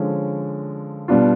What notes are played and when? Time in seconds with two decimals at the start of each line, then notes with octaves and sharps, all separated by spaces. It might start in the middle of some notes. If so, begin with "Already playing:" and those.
Already playing: D3 F3 G#3 C#4
1.08 B2 G3 B3 D4 F4